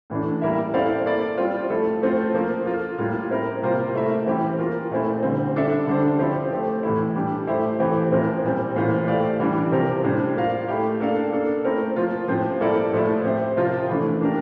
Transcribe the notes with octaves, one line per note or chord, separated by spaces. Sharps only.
A2 E3 A3 D4
G3 A#3 E4 A#4 E5
C4 E4 A4 D5 F5
A#3 E4 A4 D5
G3 C4 F4
F3 A3 E4 A4
A3 C4 F4 A4 C5
F3 A#3 F4
A#3 F4 A4
A2 G3 A#3 F4
C4 E4 A#4
C3 G3 A#3 F4 C5
A3 E4 A#4 E5
E3 G3 C4 G4
A#3 F4 A#4
A#2 A3 C4 E4
D3 G3 C4
G3 D4 A4 E5
D3 G3 D4 A4 C5
F3 C4 E4 G4 C5
A3 C4 G4
A2 E3 A3 E4
G3 D4 G4
A3 E4 G4 C5 E5
E3 A3 C4 G4
A2 F3 C4 E4 A#4
A#2 G3 C4
A2 E3 A#3 F4 C5
A3 E4 G4 D5 F5
E3 G3 D4
C3 F3 C4 G4 A#4
A2 G3 D4 G4 C5
A#3 F4 A#4 F5
A3 E4 G4
A#3 D4 A4 D5 F5
A#3 D4 A4
A3 C4 E4 A#4
F3 A#3 F4
A2 F3 C4 G4 C5
G3 A#3 E4 A4 D5
A2 F3 A3 E4
C4 G4 C5 E5
C3 F3 C4 F4 A#4
E3 A3 D4
A#3 D4 G4 A#4